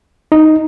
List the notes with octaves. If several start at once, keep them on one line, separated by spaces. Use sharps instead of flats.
D#4